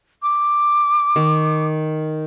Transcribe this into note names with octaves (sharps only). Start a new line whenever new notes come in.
D6
D#3